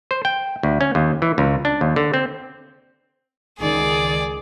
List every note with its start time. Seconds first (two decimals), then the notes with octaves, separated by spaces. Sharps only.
0.11 C5
0.25 G5
0.63 D2
0.81 C#4
0.95 D#2
1.22 E3
1.38 C#2
1.65 D4
1.81 D#2
1.96 D3
2.14 C4
3.59 C#2 D#3 G#4 D5